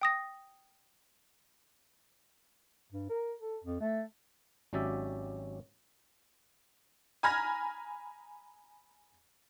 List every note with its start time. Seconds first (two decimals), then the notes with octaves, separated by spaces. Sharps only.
0.02 G5 D#6 A#6
2.92 G2
3.10 A#4
3.40 A4
3.64 F2
3.81 A3
4.73 G#1 F#3 C#4 G4 D5 E5
7.23 G#5 A#5 B5 F6 G#6 A#6